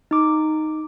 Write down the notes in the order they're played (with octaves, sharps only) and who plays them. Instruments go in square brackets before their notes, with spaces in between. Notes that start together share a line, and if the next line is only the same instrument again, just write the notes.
[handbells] D#4 D6